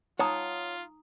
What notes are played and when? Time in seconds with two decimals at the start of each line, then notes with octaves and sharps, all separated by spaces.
0.19 D#4 F4 C#5 F#5 A5 A#5 D#6